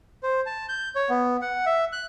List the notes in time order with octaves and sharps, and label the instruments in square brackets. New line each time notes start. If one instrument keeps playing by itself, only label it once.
[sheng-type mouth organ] C5
A5
G6
C#5
B3
F#5
E5
F#6